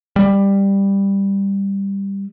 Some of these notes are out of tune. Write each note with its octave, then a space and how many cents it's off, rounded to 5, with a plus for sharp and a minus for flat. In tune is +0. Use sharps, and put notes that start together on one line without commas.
G3 +10